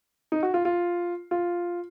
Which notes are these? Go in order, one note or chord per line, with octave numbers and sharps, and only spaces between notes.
D#4
F#4
F4
F4
F4